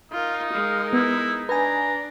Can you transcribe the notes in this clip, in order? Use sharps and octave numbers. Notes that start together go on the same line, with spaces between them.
D#4 F4 A#4
G#3 A#4 F5
B3 E4
D4 B4 G#5 A#5